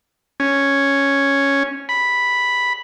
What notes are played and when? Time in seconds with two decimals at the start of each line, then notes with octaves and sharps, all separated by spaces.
0.40 C#4
1.89 B5